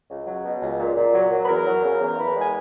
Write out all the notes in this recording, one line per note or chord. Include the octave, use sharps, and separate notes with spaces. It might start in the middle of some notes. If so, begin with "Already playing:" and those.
C#2
F#3
B2
C#2
A#2
A#2
F#3
F#3
B4
E2 A#4
F#3
C#3
E2
E2 B4
G#3
G#5